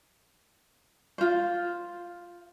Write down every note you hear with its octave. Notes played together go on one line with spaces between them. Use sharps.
F4 C5